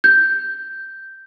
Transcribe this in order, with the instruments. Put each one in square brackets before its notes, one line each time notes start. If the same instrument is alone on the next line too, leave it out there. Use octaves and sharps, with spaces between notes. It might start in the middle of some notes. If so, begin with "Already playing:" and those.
[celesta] G6